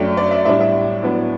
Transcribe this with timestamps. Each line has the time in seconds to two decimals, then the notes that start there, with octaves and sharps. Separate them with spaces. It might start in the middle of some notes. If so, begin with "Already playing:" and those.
Already playing: F#2 F#3 A3 D4 G5
0.17 D5
0.31 E5
0.45 A2 G3 D4 E5
0.61 E5
1.02 A2 F#3 B3 D4